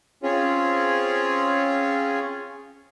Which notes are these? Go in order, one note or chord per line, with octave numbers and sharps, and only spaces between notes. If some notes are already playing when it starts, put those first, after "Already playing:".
C4 C#4 F4 G#4 C#5